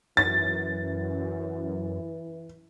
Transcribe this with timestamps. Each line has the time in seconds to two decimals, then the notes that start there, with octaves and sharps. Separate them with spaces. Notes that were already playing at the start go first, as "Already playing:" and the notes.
0.17 F#2 E3 A6